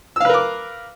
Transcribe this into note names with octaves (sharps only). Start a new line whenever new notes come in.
A#4 B4 F5 D6 E6